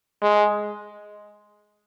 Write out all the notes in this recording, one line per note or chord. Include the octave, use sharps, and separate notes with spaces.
G#3